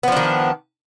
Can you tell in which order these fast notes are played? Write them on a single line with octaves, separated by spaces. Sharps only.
B3 F3 D4 D#3